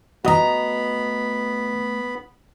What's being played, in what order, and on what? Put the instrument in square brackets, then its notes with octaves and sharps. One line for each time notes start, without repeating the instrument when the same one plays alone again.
[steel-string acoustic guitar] A3 A#5 [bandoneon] B3 B5 [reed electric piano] F#4 D#5